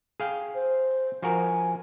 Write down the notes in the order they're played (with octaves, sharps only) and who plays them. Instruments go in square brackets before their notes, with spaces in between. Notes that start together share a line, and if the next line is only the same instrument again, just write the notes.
[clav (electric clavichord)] G#4 F5 G5
[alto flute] C5
[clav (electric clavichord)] F3 F#4 A#4 [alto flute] G#5